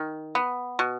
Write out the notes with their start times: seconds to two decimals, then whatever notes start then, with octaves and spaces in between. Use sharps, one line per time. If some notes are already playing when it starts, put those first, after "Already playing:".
Already playing: D#3
0.35 B3
0.79 B2